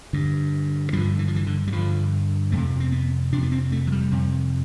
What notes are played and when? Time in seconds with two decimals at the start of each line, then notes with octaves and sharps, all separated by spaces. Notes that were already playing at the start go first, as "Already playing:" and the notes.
0.13 G2 D3
0.93 G2 F3
0.97 D3
1.19 E3
1.28 F3
1.36 E3
1.47 D3
1.67 G3
1.72 G2 D3 F3
2.52 F2 C3 A3
2.80 C4
2.92 B3
3.32 F2 C3 D4
3.43 B3
3.52 C4
3.72 A3
3.87 F3
3.92 G3
4.12 F2 C3